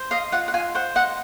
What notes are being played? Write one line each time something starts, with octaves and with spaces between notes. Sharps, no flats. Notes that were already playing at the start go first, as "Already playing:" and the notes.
Already playing: C5
D#5 F5
F4 F#5
F#5
F4 G#5
C5 F#5
D#5 F#5